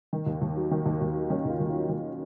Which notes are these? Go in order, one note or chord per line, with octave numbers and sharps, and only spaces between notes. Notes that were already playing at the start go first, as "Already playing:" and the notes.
D#3
D#2
D#2
F#3
D#3
D#2
D#2
F#3
D#3 C#4
D#2 F4
D#2
F4
F#3
D#3 F4